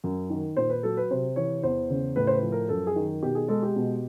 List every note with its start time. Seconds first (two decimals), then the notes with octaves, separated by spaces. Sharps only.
0.04 F#2
0.30 D#3
0.57 A#2 C5
0.70 B4
0.83 F#3 A4
0.97 B4
1.11 C3 C5
1.36 E3 C#5
1.63 E2 C5
1.90 C#3
2.16 A2 B4
2.27 C5
2.33 B4
2.43 F3
2.52 A#4
2.69 F#2 A4
2.87 G#4
2.96 D#3
3.22 B2 G4
3.35 G#4
3.48 G#3 A4
3.63 G4
3.76 B2